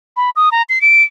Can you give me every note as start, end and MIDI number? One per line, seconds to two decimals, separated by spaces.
0.17 0.30 83
0.36 0.49 87
0.52 0.62 82
0.69 0.81 96
0.81 1.03 98